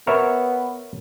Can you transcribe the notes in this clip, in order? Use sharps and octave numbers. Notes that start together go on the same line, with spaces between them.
B3 A#4 C#5 E5